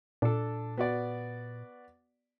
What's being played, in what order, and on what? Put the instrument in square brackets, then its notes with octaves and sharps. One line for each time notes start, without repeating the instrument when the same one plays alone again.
[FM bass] A#2 [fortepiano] D4 A4
[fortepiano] B3 F#4 D5